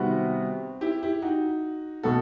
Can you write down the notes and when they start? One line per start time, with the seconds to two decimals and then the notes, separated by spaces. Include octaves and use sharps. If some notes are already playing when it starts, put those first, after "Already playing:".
Already playing: C3 D#3 G3 B3 C4 F#4
0.81 E4 G4
1.02 E4 G4
1.22 D#4 F#4
2.03 B2 A3 F#4 A4